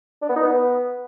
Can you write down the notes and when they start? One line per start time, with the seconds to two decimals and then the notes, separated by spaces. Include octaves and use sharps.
0.22 D4
0.29 B3
0.36 D#4
0.43 B3